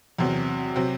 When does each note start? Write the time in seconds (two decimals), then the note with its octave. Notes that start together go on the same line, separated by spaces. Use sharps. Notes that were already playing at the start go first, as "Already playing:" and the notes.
0.19 E2 C3 F#3
0.76 C3 F#3 C4